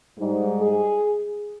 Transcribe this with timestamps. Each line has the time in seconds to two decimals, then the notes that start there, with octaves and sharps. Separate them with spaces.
0.19 G#2 G3
0.60 G#4